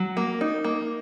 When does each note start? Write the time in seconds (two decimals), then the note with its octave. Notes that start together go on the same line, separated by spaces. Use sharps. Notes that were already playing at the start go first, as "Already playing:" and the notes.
Already playing: F#3
0.17 A#3
0.41 D#4
0.64 A#3